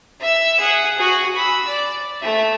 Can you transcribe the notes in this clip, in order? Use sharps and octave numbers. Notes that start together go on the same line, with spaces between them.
E5 E6
G#4 F#5
F#4 G#4
B5 E6
D5
A3 E5